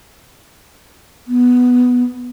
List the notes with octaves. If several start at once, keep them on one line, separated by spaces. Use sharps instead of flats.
B3